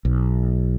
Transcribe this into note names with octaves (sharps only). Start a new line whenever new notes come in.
B1